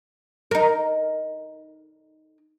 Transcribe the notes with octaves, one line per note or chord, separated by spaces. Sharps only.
D#4 A#4